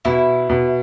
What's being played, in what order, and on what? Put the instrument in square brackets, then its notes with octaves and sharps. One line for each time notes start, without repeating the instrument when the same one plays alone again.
[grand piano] B2 [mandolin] E4
[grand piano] B2